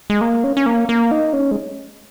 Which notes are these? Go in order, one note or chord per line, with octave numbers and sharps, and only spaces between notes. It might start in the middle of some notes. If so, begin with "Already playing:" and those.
G#3
A#3
C#4
C#4
A#3
A#3
D#4
C#4
G#3